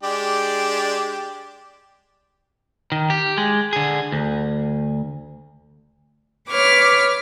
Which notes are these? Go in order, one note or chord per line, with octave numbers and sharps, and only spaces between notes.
G#3 D4 G4
D#3
G4
G#3
D3 G#4
D2
B4 C#5 D6 F6